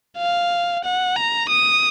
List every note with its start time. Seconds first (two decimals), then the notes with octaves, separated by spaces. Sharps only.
0.18 F5
0.84 F#5
1.16 A#5
1.49 D#6